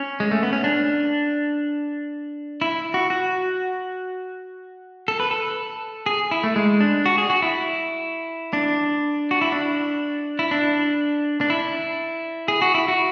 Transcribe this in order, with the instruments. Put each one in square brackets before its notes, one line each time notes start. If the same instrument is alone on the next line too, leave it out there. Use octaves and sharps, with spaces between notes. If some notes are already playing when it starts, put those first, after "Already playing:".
Already playing: [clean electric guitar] C#4
G#3
A3
B3
C#4
D4
E4
F#4
F#4
A4
B4
A4
G#4
E4
A3
G#3
D4
F#4
G#4
F#4
E4
D4
F#4
E4
D4
E4
D4
D4
E4
G#4
F#4
E4
F#4